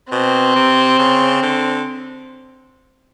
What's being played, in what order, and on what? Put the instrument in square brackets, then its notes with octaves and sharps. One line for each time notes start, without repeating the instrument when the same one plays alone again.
[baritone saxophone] B2 [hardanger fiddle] C4
[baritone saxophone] C3
C#3
D3